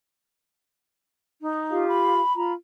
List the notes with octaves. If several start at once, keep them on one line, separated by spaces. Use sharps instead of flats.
D#4
F4 G4 F5
B5
F4 A#5 B5